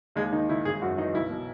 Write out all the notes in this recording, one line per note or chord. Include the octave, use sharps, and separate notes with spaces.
D#2 G#3
D#3 D#4
D#3 E4
G#1 G#4
F#2 F#4
E3 D#4
B1 E4
B2